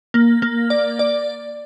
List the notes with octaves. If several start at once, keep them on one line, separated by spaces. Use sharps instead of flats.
A#3
A#3
D5
D5